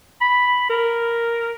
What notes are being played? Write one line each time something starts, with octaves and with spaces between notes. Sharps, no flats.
B5
A#4